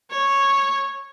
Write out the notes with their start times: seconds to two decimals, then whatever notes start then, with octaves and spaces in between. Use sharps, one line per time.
0.10 C#5